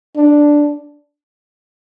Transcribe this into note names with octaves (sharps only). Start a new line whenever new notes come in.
D4